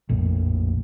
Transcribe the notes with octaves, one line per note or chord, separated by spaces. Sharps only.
A#1 F2 A2